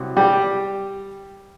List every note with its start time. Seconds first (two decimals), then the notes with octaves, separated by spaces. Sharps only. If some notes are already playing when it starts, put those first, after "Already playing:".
Already playing: C2 C3 F#3
0.17 G3 G4